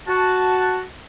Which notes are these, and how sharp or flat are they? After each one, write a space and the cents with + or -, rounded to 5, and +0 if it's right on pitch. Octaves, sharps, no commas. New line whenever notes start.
F#4 +0 A5 +0